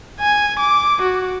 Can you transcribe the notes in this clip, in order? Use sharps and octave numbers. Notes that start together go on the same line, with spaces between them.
G#5
D6
F#4